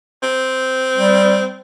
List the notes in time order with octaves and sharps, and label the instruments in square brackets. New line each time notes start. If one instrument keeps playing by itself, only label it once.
[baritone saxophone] C4
[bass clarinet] G3